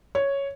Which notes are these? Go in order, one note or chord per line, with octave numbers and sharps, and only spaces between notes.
C#5